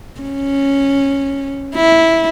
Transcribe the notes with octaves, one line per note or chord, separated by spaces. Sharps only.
C#4
E4